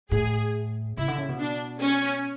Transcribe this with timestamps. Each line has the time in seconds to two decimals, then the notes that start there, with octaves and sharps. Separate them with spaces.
0.11 A2 G#4
0.97 C#3 E4
1.08 D3
1.18 C#3
1.29 B2
1.40 D4
1.82 C#4